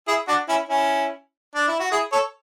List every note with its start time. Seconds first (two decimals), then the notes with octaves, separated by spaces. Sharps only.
0.07 E4 G#4
0.28 D4 F#4
0.49 C#4 E4
0.69 C#4 E4
1.55 D4
1.67 E4
1.80 F#4
1.92 E4 G#4
2.12 A4 C#5